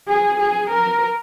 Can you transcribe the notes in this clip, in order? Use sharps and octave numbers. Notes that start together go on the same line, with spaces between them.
G#4
G#4
A#4